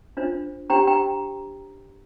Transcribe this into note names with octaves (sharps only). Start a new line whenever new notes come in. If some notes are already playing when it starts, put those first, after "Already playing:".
D4 F4 C5
D4 G4 C5 G5 A#5
G5 A#5